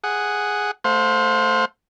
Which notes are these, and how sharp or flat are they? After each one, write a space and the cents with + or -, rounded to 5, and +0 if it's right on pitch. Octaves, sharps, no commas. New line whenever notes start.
G#4 +0 F#5 +0
A3 +0 C5 +0 F5 +40